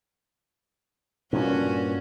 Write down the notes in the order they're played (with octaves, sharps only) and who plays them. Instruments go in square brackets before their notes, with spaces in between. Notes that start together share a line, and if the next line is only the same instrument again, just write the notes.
[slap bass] G2 A#2 [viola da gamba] C#4 F#4